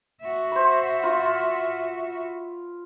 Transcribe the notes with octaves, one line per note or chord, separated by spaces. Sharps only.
F#4 E5
C5 B5
F4 B5